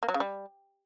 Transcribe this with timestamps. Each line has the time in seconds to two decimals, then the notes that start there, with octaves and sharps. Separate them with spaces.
0.03 A#3
0.08 F#3
0.14 C#3
0.20 G3